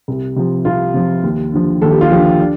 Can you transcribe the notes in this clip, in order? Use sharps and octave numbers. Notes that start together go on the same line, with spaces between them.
C2
C3 F3
C2 F4
C3 F3
D#2
D3 F3
D#2 A4
G4
F4
D3 F3 G4
D4